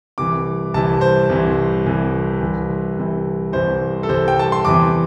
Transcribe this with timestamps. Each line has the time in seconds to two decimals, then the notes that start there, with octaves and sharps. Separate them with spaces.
0.18 C2 C3 E3 D6
0.74 C2 C3 E3 A5
1.01 C5
1.29 C2 C3 E3
1.86 C2 C3 E3
2.41 C2 C3 E3
2.98 C2 C3 E3
3.53 C2 C3 E3 C5
4.03 A4
4.09 C2 C3 E3 C5
4.28 G5
4.39 A5
4.52 C6
4.65 E2 C3 E3 D6